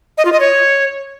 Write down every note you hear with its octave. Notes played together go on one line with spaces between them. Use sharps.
D#5
F4
D#5
C#5